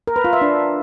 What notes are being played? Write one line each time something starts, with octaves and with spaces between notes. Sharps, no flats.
A#4
B4
F4
E5
D4